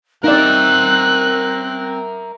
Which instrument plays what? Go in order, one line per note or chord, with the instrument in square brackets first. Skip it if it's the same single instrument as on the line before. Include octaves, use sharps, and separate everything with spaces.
[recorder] C4 [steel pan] D#4 D5 [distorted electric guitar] A#4 E5 [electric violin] F#6